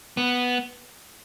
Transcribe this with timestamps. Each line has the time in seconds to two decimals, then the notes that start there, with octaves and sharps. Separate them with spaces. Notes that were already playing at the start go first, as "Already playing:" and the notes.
0.17 B3